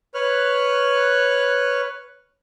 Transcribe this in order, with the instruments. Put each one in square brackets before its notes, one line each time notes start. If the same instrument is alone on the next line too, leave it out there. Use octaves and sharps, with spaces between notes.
[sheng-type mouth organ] B4 C#5 F6 F#6